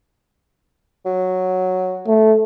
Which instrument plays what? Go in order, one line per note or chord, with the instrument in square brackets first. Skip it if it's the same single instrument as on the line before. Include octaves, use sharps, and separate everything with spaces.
[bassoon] F#3
[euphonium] A3